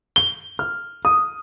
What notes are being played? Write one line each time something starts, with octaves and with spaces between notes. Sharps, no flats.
G7
F6
D#6